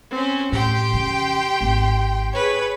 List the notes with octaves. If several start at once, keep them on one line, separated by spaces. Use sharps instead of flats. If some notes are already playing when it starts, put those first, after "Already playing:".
C4 C#4
A2 G4 G5 C6
F2 C#3
G#1 C4
G#4 B4 C#5